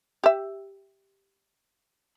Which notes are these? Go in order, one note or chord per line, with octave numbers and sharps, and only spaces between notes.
G4 E5